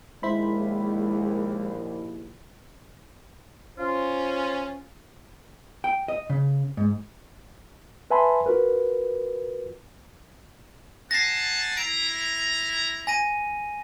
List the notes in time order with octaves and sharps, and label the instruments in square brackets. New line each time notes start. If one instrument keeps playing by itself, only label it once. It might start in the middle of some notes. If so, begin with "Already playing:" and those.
[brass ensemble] A#1 D#2 [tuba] G#3 [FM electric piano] E4 C5 B5
[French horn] C#4 [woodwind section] F4 [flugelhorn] C5
[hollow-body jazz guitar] G5
D#5
C#3
G#2
[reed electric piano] B4 E5 G#5 A5 B5 C6
F4 F#4 A#4 B4
[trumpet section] F#5 G#5 A5 [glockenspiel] A#6 C7
[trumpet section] E4 A#5 [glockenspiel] D7
[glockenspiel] G#5 A#6 D#7